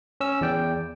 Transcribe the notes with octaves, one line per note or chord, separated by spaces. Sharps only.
C#4 E6
E2 D5 G5